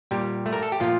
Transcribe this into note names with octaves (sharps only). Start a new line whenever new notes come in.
A#2 G3 G4
A3
A#4
A4
G4
A#2 F3 F4